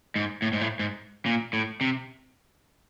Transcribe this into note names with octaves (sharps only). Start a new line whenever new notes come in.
G#2
A2
G#2
A2
G#2
A#2
A2
C3